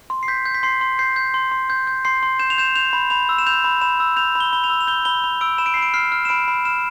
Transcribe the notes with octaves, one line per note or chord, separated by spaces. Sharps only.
C6
C7
G6 B6
G6
B6
C6 C7
C6
G6 C7
G6
C6
C6
G6
G6
C6 C7
C6
G6 E7
F7
G6 E7
G6 F7
B5
B5 F7
E6
E7
G6 F7
B5
B5 E7
E6
G6 F7
B5
G7
B5 G7
F7
E6
F7
G6 G7
B5 G7
B5 F7
E6 D7
B5 E7
D7
C7
B5
D7
F6 C7
F6
E7
B5 D7
B5
F6 E7